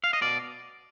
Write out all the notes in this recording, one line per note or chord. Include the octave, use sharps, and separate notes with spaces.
F5
D#5
B2 D5